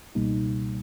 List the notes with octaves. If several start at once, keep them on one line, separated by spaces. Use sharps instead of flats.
C#2 B2 G3 A#3 D#4